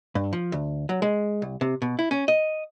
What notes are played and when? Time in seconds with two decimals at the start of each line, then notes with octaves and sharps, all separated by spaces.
0.15 G2
0.33 F3
0.52 D2
0.89 F#3
1.02 G#3
1.42 C2
1.61 C3
1.82 B2
1.99 E4
2.11 C#4
2.28 D#5